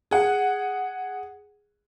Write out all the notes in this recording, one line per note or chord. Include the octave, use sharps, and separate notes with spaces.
G#4 F#5